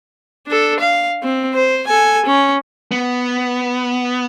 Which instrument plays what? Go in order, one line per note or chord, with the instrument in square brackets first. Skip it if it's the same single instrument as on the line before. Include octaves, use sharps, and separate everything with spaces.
[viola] D4 A4
F5
C4
C5
A4 G#5
C#4
[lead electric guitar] B3